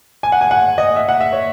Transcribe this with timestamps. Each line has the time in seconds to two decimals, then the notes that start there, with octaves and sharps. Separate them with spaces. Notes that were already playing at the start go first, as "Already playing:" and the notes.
0.23 G#5
0.32 F#5
0.41 G#5
0.51 F#5
0.78 D#5
0.96 E5
1.08 F#5
1.21 E5
1.32 C#5